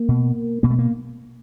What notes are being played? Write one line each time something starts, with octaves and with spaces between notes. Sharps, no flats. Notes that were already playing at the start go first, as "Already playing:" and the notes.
Already playing: A#3
B2
B2 A#3
A3
A#3